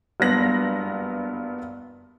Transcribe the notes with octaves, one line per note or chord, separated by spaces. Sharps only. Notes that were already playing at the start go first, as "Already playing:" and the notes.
F#1 G2 B3 A#6 F#7